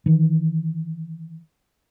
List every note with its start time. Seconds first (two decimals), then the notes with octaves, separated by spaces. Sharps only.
0.06 D#3 E3